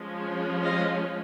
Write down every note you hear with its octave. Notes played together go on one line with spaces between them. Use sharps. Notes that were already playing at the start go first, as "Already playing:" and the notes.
Already playing: F3 G#3 C#4
D#5 F5